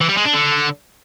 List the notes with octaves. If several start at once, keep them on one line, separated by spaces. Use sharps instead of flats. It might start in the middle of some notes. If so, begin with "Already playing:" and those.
E3
G3
G#3
D4
D3